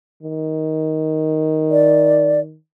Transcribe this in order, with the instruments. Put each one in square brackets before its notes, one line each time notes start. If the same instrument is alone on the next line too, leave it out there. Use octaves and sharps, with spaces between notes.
[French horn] D#3
[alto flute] D5